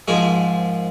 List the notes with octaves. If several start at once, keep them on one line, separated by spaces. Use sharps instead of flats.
G#2 F3 G#3 G#4 A#4